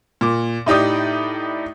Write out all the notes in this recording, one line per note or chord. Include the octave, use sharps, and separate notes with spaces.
A#2 D6
A2 D#4 G4 D5 D#6